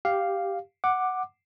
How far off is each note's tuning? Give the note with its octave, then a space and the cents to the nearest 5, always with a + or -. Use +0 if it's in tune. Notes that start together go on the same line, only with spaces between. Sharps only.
G4 +0 F5 +0
F#5 +0 D6 +10